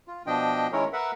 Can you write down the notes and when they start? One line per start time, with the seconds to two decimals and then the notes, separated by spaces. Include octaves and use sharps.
0.08 F4
0.27 B2 F3 D4 D#5 G5
0.72 D#3 G#3 C#4 E4 A#4 C#5
0.93 A#4 B4 E5 F#5